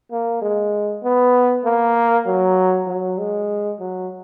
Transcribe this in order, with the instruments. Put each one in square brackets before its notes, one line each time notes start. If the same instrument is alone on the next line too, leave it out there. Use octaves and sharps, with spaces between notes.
[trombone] A#3
G#3
B3
A#3
F#3
F#3
G#3
F#3